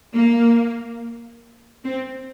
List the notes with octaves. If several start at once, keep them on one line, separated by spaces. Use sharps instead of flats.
A#3
C4